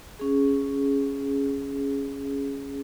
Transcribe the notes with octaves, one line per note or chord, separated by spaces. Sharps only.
C#4 G#4